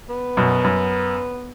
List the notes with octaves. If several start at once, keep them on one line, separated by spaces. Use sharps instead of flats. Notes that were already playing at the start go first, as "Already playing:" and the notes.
B3
F#2 B2
F#2